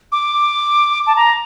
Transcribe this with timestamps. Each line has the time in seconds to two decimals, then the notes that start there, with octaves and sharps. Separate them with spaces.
0.12 D6
1.07 A5
1.16 A#5